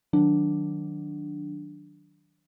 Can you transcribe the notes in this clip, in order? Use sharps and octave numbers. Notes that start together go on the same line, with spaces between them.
D#3 F#3 D4